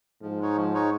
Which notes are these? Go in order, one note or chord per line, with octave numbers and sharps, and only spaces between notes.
G#2 F3
G#3 D#4 C#5
F3
G#3 D#4 C#5